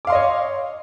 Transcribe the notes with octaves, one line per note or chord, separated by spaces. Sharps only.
C#5 D#5 F5 C6 D6